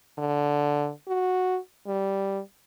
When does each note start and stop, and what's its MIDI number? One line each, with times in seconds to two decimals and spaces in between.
0.18 0.91 50
1.08 1.58 66
1.87 2.40 55